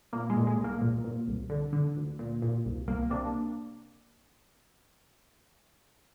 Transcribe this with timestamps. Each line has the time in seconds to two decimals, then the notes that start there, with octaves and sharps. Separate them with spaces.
0.13 A#2 A#3
0.30 G#3
0.36 A#2
0.47 G#3
0.58 C2
0.64 A#3
0.82 A#2
1.04 A#2
1.28 C2
1.50 D3
1.73 D3
1.96 D2
2.19 A#2
2.42 A#2
2.65 C2
2.88 C2 A#3
3.10 C3 A#3 D4